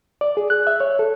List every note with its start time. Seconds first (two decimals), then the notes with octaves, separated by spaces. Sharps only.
0.21 D5
0.37 G#4
0.50 F#6
0.67 E5
0.80 C#5
0.99 A4